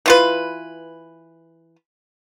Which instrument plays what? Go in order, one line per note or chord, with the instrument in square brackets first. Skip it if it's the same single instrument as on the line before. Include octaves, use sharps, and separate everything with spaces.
[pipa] E3 F4 B4